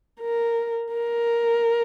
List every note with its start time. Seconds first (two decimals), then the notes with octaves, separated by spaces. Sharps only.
0.20 A#4
0.93 A#4